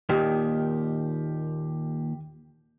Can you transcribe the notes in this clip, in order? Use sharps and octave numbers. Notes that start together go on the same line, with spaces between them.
D#2 A#2 D#3 G4